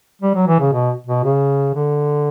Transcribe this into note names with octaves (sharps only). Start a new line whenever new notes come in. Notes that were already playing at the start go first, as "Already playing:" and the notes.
G3
F#3
E3
C#3
B2
B2
C#3
D3